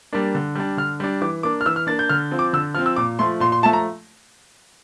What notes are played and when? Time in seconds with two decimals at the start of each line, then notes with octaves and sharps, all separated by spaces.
0.13 G3 A#3 D4
0.35 D3
0.55 G3 D4
0.77 D3 F6
1.00 G3 D4
1.22 E3 D6
1.43 A#3 D4 D6
1.61 F6
1.66 E3 E6
1.76 F6
1.87 A#3 D4 A6
1.99 G6
2.09 D3 F6
2.31 F3 C4
2.39 D6
2.53 D3 E6
2.75 F3 C4 F6
2.86 E6
2.96 A#2 D6
3.19 F3 A3 C6
3.40 A#2 C6
3.52 C6
3.63 F3 A3 A5
3.73 A#5